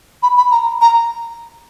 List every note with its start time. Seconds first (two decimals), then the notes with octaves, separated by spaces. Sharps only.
0.23 B5
0.37 B5
0.51 A#5
0.81 A#5